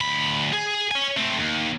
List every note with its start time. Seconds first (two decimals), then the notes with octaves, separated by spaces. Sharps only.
0.01 D2 B5
0.53 G#4
0.91 C#5 G#5
1.17 A3 C4
1.39 D#2